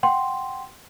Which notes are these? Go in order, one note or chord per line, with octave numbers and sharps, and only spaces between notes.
F#5 G5 C6